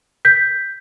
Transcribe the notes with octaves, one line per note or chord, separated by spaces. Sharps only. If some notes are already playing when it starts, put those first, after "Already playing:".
G6 B6